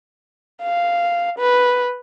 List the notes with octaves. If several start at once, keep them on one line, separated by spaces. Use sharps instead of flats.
F5
B4